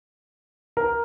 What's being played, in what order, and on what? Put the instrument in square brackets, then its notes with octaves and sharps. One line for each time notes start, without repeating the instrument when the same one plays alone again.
[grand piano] A#4